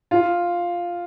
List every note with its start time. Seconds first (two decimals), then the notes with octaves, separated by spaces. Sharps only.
0.11 F4